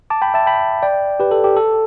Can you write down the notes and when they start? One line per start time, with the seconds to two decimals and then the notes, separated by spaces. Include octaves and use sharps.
0.10 A5 D6
0.22 G5 B5
0.34 E5 A5
0.46 G5 B5
0.83 D5 G5
1.20 G4 B4
1.31 A4
1.44 G4
1.57 A4